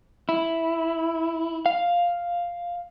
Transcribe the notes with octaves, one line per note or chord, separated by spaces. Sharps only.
E4
F5